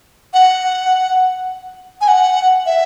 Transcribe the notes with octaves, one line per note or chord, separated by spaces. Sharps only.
F#5
G#5
F#5
E5